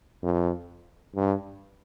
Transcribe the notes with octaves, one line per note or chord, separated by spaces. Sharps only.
F2
G2